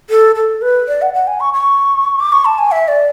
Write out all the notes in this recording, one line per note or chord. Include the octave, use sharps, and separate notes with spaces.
A4
A4
B4
D5
F#5
F#5
G#5
C#6
C#6
D6
C#6
A5
G#5
E5
D5